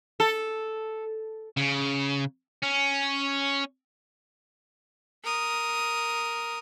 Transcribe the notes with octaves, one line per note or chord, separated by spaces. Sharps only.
A4
C#3
C#4
A#4 D#6